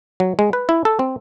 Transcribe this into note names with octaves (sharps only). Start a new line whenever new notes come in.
F#3
G#3
B4
E4
A4
C4